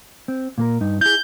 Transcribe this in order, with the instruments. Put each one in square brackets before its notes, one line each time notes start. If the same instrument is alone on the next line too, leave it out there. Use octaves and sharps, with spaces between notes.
[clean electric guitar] C4
A#2 A#3 A#4
G2 D#4
[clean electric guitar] E4 G#4 [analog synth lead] G6